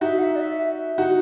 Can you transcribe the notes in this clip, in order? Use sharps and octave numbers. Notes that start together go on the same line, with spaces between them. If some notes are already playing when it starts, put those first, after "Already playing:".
D#4 F#4 E5
F#5
E5
D5
E5
D#4 F#4 F#5